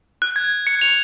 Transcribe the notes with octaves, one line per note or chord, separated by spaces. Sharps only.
F#6
G#6
C#7
F7